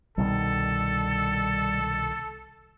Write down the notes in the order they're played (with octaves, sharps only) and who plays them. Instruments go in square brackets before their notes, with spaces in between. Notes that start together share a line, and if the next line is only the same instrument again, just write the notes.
[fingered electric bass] C2 B2 D#3 [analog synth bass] G3 [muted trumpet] A4